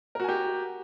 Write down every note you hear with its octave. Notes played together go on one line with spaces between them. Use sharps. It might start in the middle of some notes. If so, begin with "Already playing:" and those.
F#4 G4 A#4 G#5